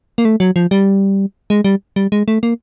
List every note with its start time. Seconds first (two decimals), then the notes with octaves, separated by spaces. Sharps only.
0.18 A#3
0.25 A3
0.40 F#3
0.56 F3
0.71 G3
1.50 G#3
1.64 G3
1.96 G3
2.12 G#3
2.28 A3
2.43 A#3